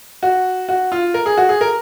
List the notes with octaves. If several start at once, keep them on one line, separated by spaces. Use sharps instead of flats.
F#4
F#4
F4
A#4
G#4
F#4
G#4
A#4